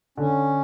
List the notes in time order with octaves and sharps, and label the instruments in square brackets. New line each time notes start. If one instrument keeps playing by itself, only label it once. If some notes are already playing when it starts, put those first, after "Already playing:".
[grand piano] D3 [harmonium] C#4